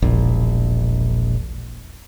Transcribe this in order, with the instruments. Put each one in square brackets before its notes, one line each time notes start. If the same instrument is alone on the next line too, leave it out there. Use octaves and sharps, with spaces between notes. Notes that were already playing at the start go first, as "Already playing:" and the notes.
[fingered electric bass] E1 A#1